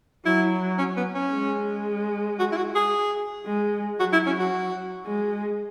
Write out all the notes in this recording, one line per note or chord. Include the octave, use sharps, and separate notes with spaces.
F#3 E4
C#4
B3
C#4
G#3
F#4
E4
F#4
G#4
G#3
F#3 F#4
E4
C#4
F#4
G#3